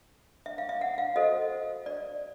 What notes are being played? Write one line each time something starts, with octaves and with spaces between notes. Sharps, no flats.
E5
F5
E5
F#5
F5
F#4 A4 C5 D#5
D5